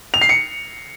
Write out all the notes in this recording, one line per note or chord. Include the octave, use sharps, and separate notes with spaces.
F7
C7
C#7